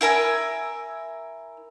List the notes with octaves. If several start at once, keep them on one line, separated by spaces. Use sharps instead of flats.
E4 A#4 G#5 E6